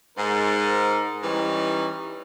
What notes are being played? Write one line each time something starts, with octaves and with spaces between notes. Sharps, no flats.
G#2 A#4
E3 G3 C#4 D#4